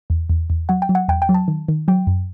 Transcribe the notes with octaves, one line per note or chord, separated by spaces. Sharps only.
E2
E2
E2
F#3 F#5
G5
F#3
F#5
E2 G5
G5
F#3
A5
D#3
D#3
F#3 G5
F#2